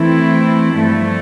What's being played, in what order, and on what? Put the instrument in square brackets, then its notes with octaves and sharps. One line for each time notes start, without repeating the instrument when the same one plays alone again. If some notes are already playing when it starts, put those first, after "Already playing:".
Already playing: [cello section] E3 A3 C4 E4
G2 F3 A3